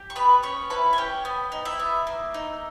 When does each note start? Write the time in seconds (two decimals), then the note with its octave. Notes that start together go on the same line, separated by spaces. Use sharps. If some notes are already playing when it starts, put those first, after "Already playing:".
Already playing: G4
0.10 C#6
0.16 B3 B4 B5
0.43 C#4 C#5 C#6
0.70 E4 B4 B5
0.93 G#5
0.98 C#4 G4 G5
1.25 B3
1.52 D#4
1.65 E4 E5
1.79 B3
2.07 A#3
2.34 D#4